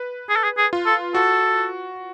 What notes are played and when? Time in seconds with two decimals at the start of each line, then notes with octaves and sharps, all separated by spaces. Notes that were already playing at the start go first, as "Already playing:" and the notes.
Already playing: B4
0.29 G#4
0.36 A4
0.44 G#4
0.58 G#4
0.73 F4
0.86 A4
1.14 F#4 A4